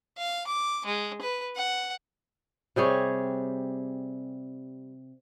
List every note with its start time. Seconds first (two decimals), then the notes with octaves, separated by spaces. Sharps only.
0.18 F5
0.47 D6
0.86 G#3
1.22 B4
1.56 F#5
2.76 C3 G3 G#4 C#5